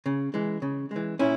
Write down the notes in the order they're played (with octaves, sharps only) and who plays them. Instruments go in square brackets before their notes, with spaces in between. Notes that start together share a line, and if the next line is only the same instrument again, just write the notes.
[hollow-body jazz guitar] C#3
E3 G#3
C#3
E3 G#3
A#2 C#4 E4